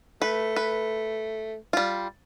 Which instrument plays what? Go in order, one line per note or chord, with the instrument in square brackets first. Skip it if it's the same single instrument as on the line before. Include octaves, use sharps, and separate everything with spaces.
[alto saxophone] A3 [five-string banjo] B4
[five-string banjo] B4
G3 F4